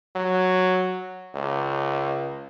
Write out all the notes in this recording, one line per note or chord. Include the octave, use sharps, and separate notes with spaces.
F#3
C#2